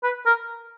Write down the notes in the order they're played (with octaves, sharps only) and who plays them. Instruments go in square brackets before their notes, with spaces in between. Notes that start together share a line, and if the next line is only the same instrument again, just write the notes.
[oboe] B4
A#4